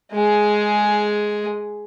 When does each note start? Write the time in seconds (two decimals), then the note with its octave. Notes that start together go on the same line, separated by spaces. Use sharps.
0.12 G#3 G#4